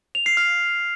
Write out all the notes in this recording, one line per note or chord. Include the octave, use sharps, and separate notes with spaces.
F7
C7
F6